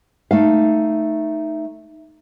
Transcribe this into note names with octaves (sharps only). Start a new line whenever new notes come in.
A3 D#4 F5